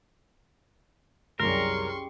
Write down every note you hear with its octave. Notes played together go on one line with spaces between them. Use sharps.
C2 F#2 C#3 G3 A#4 C6 C#6